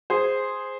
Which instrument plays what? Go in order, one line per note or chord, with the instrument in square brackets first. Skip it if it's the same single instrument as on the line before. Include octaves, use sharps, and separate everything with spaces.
[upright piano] G#4 C5